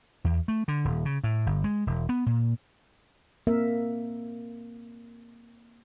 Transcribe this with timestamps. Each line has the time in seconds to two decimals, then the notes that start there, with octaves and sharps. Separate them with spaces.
0.24 E2
0.48 A3
0.68 D3
0.85 D#1
1.05 C#3
1.24 A2
1.46 G1
1.64 G#3
1.87 E1
2.09 B3
2.26 A#2
3.47 A#3 C4 A#4 E5